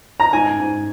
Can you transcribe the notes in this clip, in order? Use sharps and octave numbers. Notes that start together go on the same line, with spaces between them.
A#5
G#2 G#5
G#2